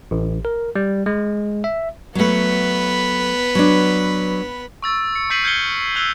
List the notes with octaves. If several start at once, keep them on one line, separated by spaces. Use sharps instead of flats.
A1
A#4
G3
G#3
E5
F#3 A3 B3 B4
F#3 D4
C#6 E6 A6
C#7
C#6 G6 B6 C7 D#7 F#7
F6 G6 G#6 C7 C#7 G7
E6 F#6 G#6 D#7 F7 G7